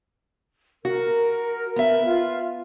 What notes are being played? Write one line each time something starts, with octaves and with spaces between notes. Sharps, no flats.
F#4 A#4
B3 E5
F4